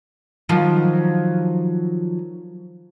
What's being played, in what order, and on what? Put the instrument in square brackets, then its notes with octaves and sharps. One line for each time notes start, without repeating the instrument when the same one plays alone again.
[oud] D#3 F3 F#3